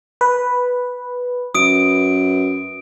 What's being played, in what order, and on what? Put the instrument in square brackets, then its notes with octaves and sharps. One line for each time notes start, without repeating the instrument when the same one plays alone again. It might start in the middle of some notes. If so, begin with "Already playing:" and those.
[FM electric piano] B4
[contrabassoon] F#2 [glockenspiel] D#6 D7